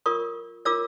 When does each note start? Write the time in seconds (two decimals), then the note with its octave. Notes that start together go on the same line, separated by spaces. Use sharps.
0.06 F4 A#4 C#5 C#6 D#6
0.65 F4 A#4 C#5 D6 E6